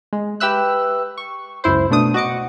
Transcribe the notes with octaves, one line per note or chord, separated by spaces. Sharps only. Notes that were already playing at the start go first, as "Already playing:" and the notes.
G#3
G4 B4 E5 E6 F#6
C#6
C#2 F#2 E4 C5
B2 A3 D4 D#6
F#4 D#5 D6 C#7